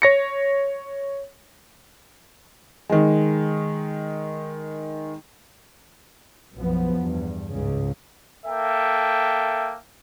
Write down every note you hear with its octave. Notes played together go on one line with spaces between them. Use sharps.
C#5 A#6 C#7
D#3 G#3
B1 F#2 F3 B3
E2 G2
C#2 G#2 C#3
A#3 A4 E5 G5